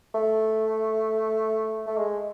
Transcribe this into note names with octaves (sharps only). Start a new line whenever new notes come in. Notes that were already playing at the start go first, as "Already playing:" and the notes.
A3
A3
G#3